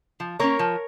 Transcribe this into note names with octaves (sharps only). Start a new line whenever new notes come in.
F3
A#3 C#4 A#4 C#5
F3